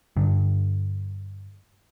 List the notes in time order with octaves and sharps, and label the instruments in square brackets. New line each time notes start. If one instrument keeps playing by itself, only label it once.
[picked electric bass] G2 D3